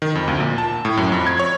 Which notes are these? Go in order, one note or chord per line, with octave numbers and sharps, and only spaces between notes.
D#3
F2
D2
A#2
A5
A2
F#2
F2
G#6
C#5